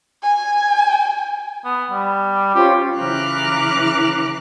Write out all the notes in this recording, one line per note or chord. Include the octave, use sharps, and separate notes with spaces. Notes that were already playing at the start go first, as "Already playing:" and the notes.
G#5
B3
G3
C#4 F4 G4 C5
C#3 E3 A#5 D6 F6 F#6